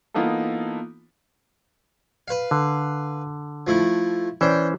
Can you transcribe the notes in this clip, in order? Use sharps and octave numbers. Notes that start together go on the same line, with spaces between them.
E3 A#3 B3 D#4 F4 A4
B4 F5
D3
F3 A3 E4
E3 C#4 D4 C5 G5